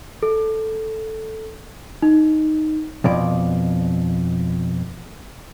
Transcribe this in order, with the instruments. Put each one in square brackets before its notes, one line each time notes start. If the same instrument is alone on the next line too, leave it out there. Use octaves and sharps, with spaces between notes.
[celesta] A4
D#4
[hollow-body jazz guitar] F2 B2 D5